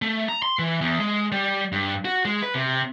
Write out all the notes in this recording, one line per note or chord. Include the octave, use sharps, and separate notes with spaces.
A3
A#5
C6
E3
E2
G#3
G3
G2
F#4
G#3
B4
C3